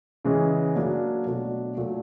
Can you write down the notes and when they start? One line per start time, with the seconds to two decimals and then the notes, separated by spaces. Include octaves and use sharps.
0.25 C#3 E3 G#3 C#4
0.75 F#3 A#3 D4
1.26 B2 F#3 A3 D4
1.77 A#2 F#3 A3